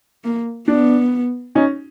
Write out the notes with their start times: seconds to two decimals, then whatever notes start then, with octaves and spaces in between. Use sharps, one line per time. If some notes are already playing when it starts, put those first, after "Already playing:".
0.24 A#3
0.68 B3 D4
1.55 C#4 D#4